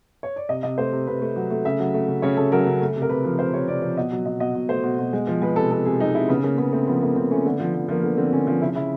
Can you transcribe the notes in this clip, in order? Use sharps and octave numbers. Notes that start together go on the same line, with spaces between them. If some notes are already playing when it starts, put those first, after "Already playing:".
C#5
D5
C3 D#5
C3 D#5
A3 C5
C3
C3 B4
A3
F#3
A3
C#3 E5
F#3
A3
C#3
C#3 C#5
C#3 A4
F#3 A#4
C#3
A3
C3
A#4
C3 B4
F3
C3 C5
C3 C#5
C3 D5
F3
B2 D#5
F#3
B2 D#5
B2 D#5
B2
A3 C5
B2
B2
G#3
F3
G#3 B4
C3 A4
C3 A4
C3 G#4
G#3 D#4
C3 E4
C#3 B3
C#3 A#3
C#3 B3
A3 C4
F3 B3
A3 A#3
C#3 C4
A3 C#4
D3 B3
F3
F3
F3 A#3
D3 B3
D3 C4
D3 C#4
F3
C#3 E4
C#3 E4